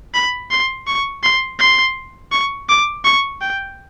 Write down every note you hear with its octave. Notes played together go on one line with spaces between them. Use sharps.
B5
C6
C#6
C6
C6
C#6
D6
C#6
G5